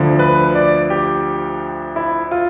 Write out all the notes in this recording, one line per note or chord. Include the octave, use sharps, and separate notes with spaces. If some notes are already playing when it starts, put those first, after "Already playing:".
Already playing: D2 D3 F3
B4
D5
G4
E4
F4